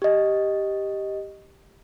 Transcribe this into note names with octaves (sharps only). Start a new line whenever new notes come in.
G4 D#5